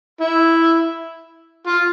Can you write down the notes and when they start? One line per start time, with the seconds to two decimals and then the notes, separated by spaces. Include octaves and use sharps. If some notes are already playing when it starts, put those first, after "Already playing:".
0.21 E4
1.67 F4